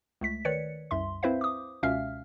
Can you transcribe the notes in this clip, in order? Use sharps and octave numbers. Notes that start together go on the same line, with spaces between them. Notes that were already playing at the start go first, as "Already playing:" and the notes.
C#2 A3 B6
D#3 B4 C#5 D5 C#7
C2 F#2 E5 C6
C4 E4 B4 C5 E5 F5
D6 D#6
C#2 B2 C#4 E5 F5 F6